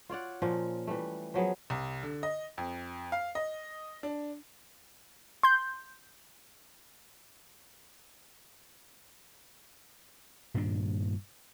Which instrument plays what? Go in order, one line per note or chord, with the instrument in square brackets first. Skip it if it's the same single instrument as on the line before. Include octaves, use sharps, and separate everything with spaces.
[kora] F4 C#5 D5 F#5
A#2 F3 C#4 A#4
E3 G3 A3
F3 F#3 B3 G#4
[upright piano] C2
D3
D#5
F2
F5
D#5
D4
[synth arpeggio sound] C6 G6
[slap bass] G2 A#2 D#3 D4